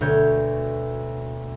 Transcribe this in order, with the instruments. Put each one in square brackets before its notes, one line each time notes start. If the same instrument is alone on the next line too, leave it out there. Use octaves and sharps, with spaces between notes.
[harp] D2 B2 C#5 G6